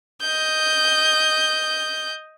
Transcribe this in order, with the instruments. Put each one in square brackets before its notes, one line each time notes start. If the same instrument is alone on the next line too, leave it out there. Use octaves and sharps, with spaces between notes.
[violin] D#5 G6